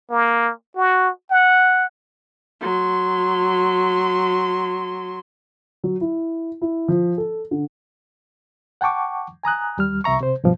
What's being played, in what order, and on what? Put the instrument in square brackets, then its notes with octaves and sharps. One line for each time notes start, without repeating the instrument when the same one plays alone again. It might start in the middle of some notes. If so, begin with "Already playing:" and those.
[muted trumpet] A#3
F#4
F#5
[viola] F#3 C6
[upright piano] F#3
E4
E4
F3
A4
D3
[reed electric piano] F#5 G5 A5 C#6 D6
G#5 A#5 D#6 F#6
D#2 G3 F6
C2 C3 E5 A#5 C#6
C3 C5
G2 B2 F3